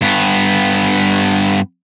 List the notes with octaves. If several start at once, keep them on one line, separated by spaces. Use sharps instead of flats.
G2 B3